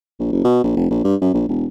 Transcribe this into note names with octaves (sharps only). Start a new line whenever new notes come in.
A#1
F#1
B2
A#1
F1
A#1
G2
F#2
A#1
E1